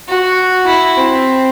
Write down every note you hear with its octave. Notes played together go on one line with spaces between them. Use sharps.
F#4
E4
C4